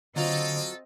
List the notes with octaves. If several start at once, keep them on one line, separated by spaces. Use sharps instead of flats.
D3 F#3 C4 F4 A4 D#5